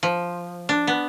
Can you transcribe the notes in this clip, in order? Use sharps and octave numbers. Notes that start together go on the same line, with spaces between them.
F3
D4
B3